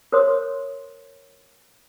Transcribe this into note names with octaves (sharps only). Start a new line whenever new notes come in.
A#4 C5 C#5 C6 D#6